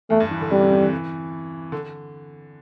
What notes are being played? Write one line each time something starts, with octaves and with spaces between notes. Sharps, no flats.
E2 A3
G2
E3
D3
C3 G3
C3
C3
E3
D3